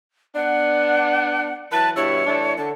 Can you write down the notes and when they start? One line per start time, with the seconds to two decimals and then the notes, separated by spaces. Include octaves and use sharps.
0.35 B3 D4 F#5
1.72 E3 F#3 B4 A5
1.96 G2 B2 E4 C#5
2.26 E3 A3 D4
2.57 D3 A5